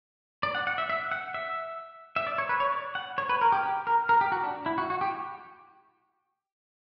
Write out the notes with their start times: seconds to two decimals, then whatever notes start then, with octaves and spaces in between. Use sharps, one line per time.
0.43 D5
0.55 F#5
0.67 F#5
0.78 E5
0.90 E5
1.11 F#5
1.34 E5
2.16 E5
2.27 D5
2.38 C#5
2.49 B4
2.60 C#5
2.72 D5
2.95 F#5
3.18 C#5
3.29 B4
3.41 A#4
3.52 G4
3.63 G4
3.87 A#4
4.09 A#4
4.21 G4
4.32 F#4
4.43 D4
4.66 E4
4.78 F#4
4.90 F#4
5.01 G4